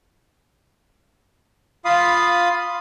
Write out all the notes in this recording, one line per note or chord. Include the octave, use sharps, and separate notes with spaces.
F4 F5 B5 D#6